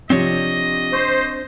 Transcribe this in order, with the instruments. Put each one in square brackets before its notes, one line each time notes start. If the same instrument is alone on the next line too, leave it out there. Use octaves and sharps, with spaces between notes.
[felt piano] C3 F3 [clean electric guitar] C4 D4 C#5 [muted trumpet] D#5
[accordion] C5 [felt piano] C#6